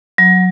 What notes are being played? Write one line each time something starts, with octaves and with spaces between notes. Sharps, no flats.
F#3